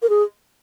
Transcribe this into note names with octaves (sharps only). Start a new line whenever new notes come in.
A#4
G#4